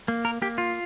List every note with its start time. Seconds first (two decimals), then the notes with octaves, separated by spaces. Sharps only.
0.08 A#3
0.25 A#4
0.42 A#3 G4
0.58 F4